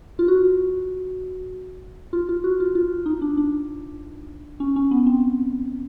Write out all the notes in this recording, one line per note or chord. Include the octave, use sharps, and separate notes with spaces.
F4
F#4
F4
F4
F#4
F4
F4
D#4
D4
D4
C#4
C#4
B3
C4